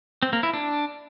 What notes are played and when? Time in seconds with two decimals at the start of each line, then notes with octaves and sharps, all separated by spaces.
0.23 C4
0.33 A#3
0.43 E4
0.54 D4